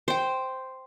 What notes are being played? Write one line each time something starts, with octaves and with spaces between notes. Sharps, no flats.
C5 G5